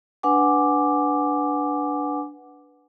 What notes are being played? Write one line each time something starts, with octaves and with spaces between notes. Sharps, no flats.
D4 B4 F#5 G#5 D6